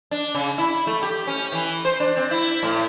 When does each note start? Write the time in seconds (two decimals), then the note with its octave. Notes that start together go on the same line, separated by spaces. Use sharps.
0.11 D4
0.35 C#3
0.58 E4
0.87 A3
1.03 G4
1.27 C#4
1.52 E3
1.85 C5
2.00 D4
2.17 C4
2.31 E4
2.63 A2